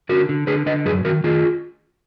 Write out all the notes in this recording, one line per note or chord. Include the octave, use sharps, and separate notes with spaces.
D3 F#4 A#4
D3
D3 G#4 B4
D3 B4 D#5
F#2 G#4 B4
D#3 F#4 A#4
D#3 F4 G#4